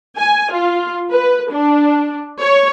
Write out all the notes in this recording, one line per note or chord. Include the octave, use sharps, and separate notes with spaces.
G#5
F4
B4
D4
C#5